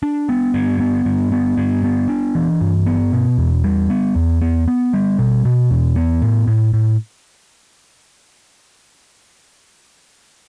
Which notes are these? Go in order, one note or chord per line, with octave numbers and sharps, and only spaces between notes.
D4
B3
G2
B3
G2
B3
G2
B3
D4
E3
G2
B3
B2
E2
G3
B3
E2
B3
B3
G3
B2
B2
E2
B3
A2
A2
A2